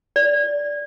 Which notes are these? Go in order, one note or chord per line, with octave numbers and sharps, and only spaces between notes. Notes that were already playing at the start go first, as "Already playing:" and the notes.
D5